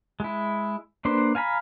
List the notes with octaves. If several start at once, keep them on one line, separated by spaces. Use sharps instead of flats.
G#3 E4
A#3 D4 B4 C5 C6
F5 G#5 A#5 B5